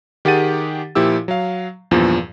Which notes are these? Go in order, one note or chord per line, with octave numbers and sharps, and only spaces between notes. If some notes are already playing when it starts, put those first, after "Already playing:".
D#3 G4 G#4 F#5 A6 D#7
A#2 F3 E4 G4 E6
F#3 F5
E2 G2 A#2 F3